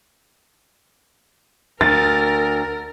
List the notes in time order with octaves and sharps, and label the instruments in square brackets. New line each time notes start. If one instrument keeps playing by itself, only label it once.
[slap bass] D2 [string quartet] A#4 [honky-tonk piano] A6